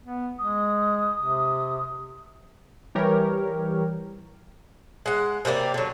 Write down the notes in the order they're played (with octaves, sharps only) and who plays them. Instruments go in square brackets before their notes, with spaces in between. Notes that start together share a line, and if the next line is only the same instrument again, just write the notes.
[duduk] B3
[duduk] G#3 [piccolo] D#6
[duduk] C3
[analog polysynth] E3 G3 G4 A#4 C#5
[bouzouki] G#3 F#5
C3 G3 A#3 D5
D3 F#3